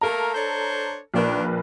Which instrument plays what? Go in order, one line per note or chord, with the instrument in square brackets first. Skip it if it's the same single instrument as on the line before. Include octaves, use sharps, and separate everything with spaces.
[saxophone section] A3 A#3 A#4 [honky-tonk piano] A4 A#5
[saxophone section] D4 C5 C#5
[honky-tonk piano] A#1 A#3 B4 [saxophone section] D#3 D4